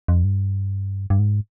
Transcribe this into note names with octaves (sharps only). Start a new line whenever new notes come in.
F2
G2
G2
G#2